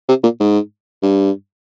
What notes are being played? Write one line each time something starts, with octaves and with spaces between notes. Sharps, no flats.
C3
A#2
G#2
G2